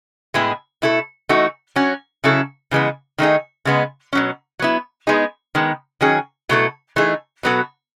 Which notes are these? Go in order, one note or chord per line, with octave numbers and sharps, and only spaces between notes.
A2 G#3 B3 E4 G#4
B2 A3 E4 A4
E3 A3 D#4 F#4
F#3 C#4 F#4
C#3 F#3 C#4 E4 A4
C#3 E3 G#3 B3
D#3 A3 D#4 G#4
C#3 G#3 B3
B2 F#3 C#4
F#3 B3 E4
G#3 B3 D#4 G#4
D#3 G#3 B3
D#3 F#3 C#4 G#4
B2 F#3 A3 E4 A4
E3 A3 D#4 G#4
B2 F#3 B3 F#4 A4